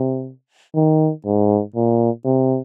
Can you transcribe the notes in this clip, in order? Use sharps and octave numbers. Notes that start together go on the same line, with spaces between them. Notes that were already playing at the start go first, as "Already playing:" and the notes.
Already playing: C3
D#3
G#2
A#2
C3